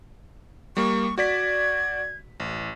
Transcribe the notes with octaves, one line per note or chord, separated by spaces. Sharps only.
G3 A#3 C#6
F#4 D5 G#6 B6
A1